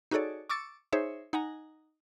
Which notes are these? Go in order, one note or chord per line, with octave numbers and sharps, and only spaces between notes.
D#4 F#4 G#4 A4 C#5 D5
C#6 D6 E6 A6 C#7
D#4 G#4 C5 C#5 E5
D#4 F#5 G#5 A#5